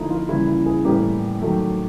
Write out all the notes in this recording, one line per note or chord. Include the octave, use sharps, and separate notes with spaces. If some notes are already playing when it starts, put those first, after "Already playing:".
Already playing: D3 F3 A#3 D#4 E4
F4
C#3 E3 G3 A#3 E4
E4
G#4
A2 E3 G3 A#3 G4
D#3 F#3 A3